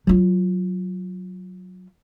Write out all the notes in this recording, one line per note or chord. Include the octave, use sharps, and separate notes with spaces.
F#3 F4